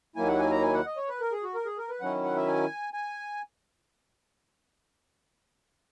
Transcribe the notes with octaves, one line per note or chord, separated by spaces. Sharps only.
D#2 D#3 F#3 A#3 E4 G#5
F#5
G#5
A#5
G#5
F#5
D#5
C#5
B4
A#4
G#4
F#4
A#4
G#4
A#4
B4
D#3 F#3 C#4 E4 F#5
F#5
E5
G#5
G#5